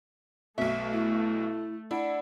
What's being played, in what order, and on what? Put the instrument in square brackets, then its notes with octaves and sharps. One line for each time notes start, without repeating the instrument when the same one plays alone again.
[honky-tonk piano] B1 B2 [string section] A3 [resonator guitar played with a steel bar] E5
[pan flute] E4
[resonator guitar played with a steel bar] D4 [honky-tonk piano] E4 [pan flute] F#5